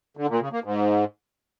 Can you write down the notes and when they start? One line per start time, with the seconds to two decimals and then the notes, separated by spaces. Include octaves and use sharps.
0.17 D3
0.29 A#2
0.40 C#3
0.52 A#3
0.64 G#2